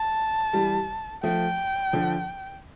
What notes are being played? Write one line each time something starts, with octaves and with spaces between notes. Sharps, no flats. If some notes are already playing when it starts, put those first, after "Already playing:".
Already playing: A5
E3 G3
F3 A3 G5
D3 F3